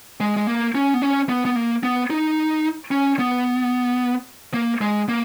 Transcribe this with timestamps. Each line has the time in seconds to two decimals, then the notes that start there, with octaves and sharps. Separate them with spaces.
0.20 G#3
0.37 G#3
0.47 A#3
0.75 C#4
0.94 B3
1.02 C#4
1.29 B3
1.45 B3
1.56 A#3
1.83 B3
2.10 D#4
2.91 C#4
3.19 B3
4.54 A#3
4.81 G#3
5.09 A#3